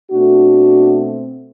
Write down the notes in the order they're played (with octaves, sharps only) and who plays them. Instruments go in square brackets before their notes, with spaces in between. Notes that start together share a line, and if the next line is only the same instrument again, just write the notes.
[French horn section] B2 A3 C4 D4 F#4